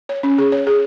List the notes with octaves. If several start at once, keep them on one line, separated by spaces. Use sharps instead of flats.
C#5
C#4
G#4
C#5
G#4